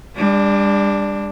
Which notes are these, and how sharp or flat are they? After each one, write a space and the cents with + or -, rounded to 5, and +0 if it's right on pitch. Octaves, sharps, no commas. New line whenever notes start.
G3 +40 D4 +0